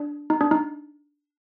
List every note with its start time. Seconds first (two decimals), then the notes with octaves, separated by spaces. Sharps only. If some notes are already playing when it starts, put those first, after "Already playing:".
Already playing: D4
0.30 D#4
0.41 D4
0.51 D#4